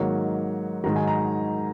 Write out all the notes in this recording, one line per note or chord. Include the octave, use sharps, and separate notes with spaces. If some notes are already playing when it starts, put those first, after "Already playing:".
Already playing: G#2 D#3 F#3 A#3 C#5
G#2 D#3 F#3 A#5
G#5
A#5